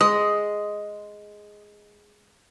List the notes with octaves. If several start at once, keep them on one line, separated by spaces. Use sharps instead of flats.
G#3 D#5